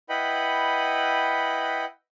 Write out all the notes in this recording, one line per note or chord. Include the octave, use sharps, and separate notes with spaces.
E4 B4 D#5 F#5 G5 B5